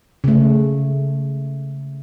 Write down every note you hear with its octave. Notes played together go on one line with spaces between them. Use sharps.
C#3 A3